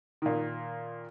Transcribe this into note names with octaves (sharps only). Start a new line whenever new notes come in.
A#2 D#3